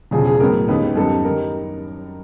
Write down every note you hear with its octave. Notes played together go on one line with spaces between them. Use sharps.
E1 E2 C#3 F3 G#4
G#4
A1 A2 F#3 B3 A#4
D#2 D#3 G#3 B3 B4
F#2 D#3 G3 B3 A4
D#3 G3 A#4